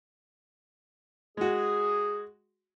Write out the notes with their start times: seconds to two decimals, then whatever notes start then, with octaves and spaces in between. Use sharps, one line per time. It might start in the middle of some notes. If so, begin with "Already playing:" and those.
1.37 G#3 F#4 G#4